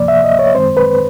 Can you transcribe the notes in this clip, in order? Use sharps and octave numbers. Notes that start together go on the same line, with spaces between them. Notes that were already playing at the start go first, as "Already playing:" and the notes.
Already playing: D2 C3 F3 A#3 D5
E5
D#5
C#5
F#2 D#3 G#3 C4 C5
B4